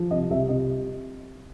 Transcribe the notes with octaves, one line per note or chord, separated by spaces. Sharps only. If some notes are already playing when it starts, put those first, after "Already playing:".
Already playing: F3
C2 D#5
C2 E5
C3 D#5